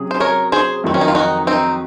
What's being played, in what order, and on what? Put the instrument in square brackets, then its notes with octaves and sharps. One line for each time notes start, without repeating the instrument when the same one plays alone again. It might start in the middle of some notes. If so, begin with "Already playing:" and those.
Already playing: [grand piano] C3 F#3 C#4 G#4
[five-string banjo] C5
A#4 C#5
G#4 C5
[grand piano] F2 D#3 F#3 [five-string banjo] C4
[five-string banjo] C#4
D#4
F4
D#4 F#4
C4 D#4